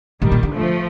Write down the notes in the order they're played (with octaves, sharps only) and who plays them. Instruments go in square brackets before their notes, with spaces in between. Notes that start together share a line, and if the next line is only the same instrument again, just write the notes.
[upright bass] A2 [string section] D#3 G3
[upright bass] A#2
D3
[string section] F3 A3